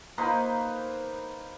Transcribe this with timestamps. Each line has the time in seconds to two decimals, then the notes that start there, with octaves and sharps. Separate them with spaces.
0.18 A#3 D#4 B4 C5